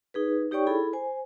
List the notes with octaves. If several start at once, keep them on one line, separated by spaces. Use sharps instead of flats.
D#4 G#4 B4
D#4 G4 C#5 D5 G5 C#6
E4 G#4 A4 B5
C5 G#5